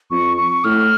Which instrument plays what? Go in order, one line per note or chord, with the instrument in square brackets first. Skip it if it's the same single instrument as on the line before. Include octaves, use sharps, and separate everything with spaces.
[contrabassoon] F2 [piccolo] C#6
[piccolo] C#6
[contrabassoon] A2 [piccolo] F6